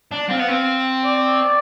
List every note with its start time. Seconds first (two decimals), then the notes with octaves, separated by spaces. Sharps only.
0.12 D4
0.30 C4 F5
0.40 B3
0.49 C4
1.05 D5